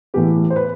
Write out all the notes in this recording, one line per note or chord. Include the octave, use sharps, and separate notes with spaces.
A2 E3 B3 G4
C5
B4